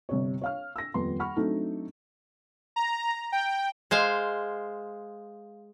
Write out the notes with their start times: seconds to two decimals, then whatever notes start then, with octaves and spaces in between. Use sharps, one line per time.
0.09 G1 C3 C#5
0.41 C#5 F5 F6
0.76 E6 A#6
0.94 D#1 F2 B3 C6
1.19 F#5 B5 C#6 F6
1.36 F#3 A3 C4 D4 D#4 A4
2.76 A#5
3.32 G5
3.91 G#3 C5 F5